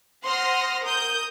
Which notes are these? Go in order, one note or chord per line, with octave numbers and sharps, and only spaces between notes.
C5 F#5 C6 D#6 F6 A#6
A#4 D#6 G6